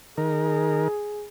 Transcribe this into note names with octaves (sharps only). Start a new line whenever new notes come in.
D#3 G#4 A#4